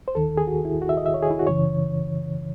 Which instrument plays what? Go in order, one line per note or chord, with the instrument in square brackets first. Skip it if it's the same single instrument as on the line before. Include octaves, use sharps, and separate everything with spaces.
[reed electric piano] C5
D#2 D#3 A4
G#4
F#4
E4
F#4
E5
D#5
E5
C#5
G#4
E4
F#4
F#2 C#3 E3 C#5